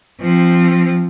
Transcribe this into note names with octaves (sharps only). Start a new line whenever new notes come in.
F3 C4